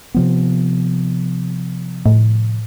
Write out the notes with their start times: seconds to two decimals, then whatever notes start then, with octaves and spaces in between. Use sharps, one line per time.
0.14 C3 F3 B3
2.06 A2